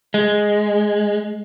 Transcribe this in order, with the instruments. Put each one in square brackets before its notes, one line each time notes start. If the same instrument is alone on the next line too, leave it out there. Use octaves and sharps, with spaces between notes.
[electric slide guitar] G#3